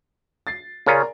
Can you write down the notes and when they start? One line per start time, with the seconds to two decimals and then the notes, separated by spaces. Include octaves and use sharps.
0.47 A6 C7
0.86 C#3 C#4 F4 A#4 D5 A#5